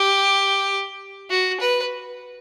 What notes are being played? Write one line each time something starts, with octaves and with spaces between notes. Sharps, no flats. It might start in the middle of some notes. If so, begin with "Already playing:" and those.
Already playing: G4
F#4
B4